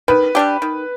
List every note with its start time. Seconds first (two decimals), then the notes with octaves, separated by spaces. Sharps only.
0.08 D#3 B4
0.35 G3 D4 G4
0.62 D#3